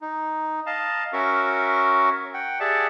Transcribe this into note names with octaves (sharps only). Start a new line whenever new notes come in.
D#4
D#5 F5 A5
C#4 F#4 A#4 E5 C#6
F#5 G5
G4 G#4 D5 E5 F#5 A5